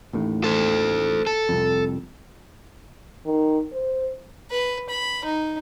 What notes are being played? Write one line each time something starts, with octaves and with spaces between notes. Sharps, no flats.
A1 D#2 A2
A4 C5
A4
C2 F2
D#3
C5
B4
B5
D#4